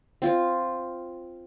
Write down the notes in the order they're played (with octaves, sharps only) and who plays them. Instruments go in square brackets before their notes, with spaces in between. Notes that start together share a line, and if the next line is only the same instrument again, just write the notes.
[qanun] C4 F4